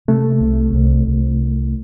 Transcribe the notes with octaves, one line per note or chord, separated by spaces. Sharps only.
C3 A3
C2
C2
C2